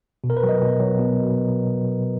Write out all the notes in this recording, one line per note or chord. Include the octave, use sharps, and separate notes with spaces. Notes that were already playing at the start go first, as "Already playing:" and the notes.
B2
A#4
B4
F#3
D#5
B2
F#3
B2